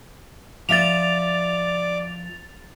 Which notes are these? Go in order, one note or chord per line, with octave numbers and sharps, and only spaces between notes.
F3 D5 E5 D6 A6 F7